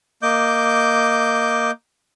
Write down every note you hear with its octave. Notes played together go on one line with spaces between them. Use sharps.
A#3 D#5 D6 G6